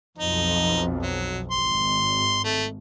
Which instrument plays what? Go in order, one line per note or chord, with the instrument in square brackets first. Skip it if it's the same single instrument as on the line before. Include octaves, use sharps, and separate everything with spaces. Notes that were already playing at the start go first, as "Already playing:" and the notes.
[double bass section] B1 F2 [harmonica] D#4
[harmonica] F#3
[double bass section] G#1 [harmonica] C6
[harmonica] A3